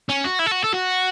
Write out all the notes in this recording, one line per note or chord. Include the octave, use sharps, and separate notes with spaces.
C#4
F#4
E4
A4
F#4
A4
F#4